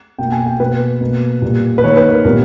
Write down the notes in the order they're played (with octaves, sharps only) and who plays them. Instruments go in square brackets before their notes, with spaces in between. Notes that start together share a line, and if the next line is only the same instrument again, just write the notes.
[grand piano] B2 A#3 G5
G#5
G5
B2 A#3 B4
B2 A#3
A#2 G3 A#3
B4
D#3 A#3 C#5
B4
A#4
A#2 G3 B3 A#4